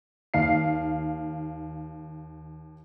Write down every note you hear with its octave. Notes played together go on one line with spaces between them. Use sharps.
D#2 F5 C7